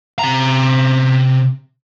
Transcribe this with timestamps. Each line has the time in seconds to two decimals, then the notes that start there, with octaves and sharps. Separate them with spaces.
0.19 C3 A#5